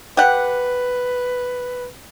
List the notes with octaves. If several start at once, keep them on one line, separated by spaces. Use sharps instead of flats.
G4 B4 F#5